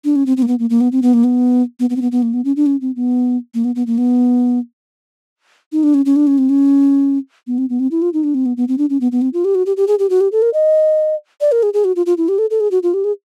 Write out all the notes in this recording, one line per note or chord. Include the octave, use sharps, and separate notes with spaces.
D4
C#4
C4
C4
A#3
B3
A#3
A#3
B3
C4
B3
A#3
B3
B3
B3
C4
B3
B3
A#3
B3
C#4
D4
C#4
C4
B3
A#3
B3
B3
A#3
B3
D#4
D4
C#4
C#4
D4
C#4
C4
C#4
B3
C4
B3
C4
E4
F4
D#4
D4
C4
B3
B3
C4
D4
C#4
B3
B3
C4
F4
G4
F#4
G4
G4
G#4
G4
F#4
G4
A4
A#4
D#5
D5
A#4
G#4
G#4
F#4
F4
F4
E4
G4
A4
A4
G#4
F#4
F4
G4
G#4